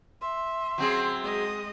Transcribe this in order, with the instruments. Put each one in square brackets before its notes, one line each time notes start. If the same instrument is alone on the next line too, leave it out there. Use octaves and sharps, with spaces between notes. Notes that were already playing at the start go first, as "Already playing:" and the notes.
[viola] E5 [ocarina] C6
[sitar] F#3 C4 G#4
[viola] G#3 D#5